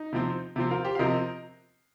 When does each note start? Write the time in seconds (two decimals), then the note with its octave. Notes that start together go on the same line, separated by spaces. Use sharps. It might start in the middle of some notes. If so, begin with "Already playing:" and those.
Already playing: D#4
0.13 C3 F3 C4
0.56 C3 F3 C4
0.71 F4 A#4
0.85 G4 C5
0.95 F5
0.99 C3 F3 C4 A#4 D#5